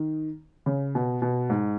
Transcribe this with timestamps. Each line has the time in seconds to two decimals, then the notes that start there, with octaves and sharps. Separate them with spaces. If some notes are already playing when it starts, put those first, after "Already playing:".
Already playing: D#3
0.66 C#3
0.95 B2
1.22 B2
1.50 G#2